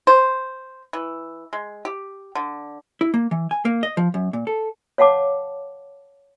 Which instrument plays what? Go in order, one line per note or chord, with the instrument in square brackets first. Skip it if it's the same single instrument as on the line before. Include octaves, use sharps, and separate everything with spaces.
[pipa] C5
E3
G#3
G4
D3
[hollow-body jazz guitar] E4
A#3
E3
G#5
A#3
D#5
F3
F#2
A#2
A4
[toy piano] C#5 F5 F#5 A5 D6